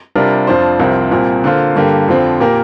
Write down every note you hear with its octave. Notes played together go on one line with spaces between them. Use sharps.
C3 G3 D4 F4 A#4
F2 F3 D4 F4 C5
C2 C3 F3 C4 A#4
C2 A#2 F3 C4 A#4
D3 A#3 F4 C5
G2 D3 A#3 G4
F2 D3 F3 C4
A#2 A#3 G4 A#4